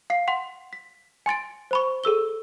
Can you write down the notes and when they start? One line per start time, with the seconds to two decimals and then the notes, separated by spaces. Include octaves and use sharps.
0.10 F5 C7
0.28 F#5 C6
0.73 B6
1.26 G#5 C6 A6 D7
1.71 C5 B5 C#6
2.04 G#4 A4 E6 G7